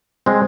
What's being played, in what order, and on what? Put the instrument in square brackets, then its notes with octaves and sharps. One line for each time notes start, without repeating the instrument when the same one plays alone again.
[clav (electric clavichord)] G#3 C4